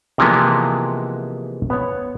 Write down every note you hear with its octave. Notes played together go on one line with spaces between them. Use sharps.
C3 E3 F3 G#3 A#3 B3
B3 C#5